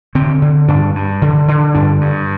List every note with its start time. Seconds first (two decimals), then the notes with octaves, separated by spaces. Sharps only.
0.15 D3 C4
0.42 D3
0.68 G2 D4
0.95 G2
1.22 D3
1.48 D3
1.74 G2 D4
2.01 G2